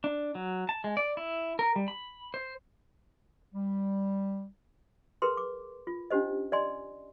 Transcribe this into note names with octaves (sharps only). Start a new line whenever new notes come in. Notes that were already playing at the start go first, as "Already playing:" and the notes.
D4
F#3
A5
G#3
D5
E4
A#4
G3
B5
C5
G3
G#4 A#4 B4 C6
D6
F4
C#4 D4 G4 C5 D#5
D5 D#5 G#5 C6